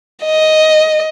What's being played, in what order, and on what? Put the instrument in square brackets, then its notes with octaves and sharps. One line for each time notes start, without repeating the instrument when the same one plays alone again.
[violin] D#5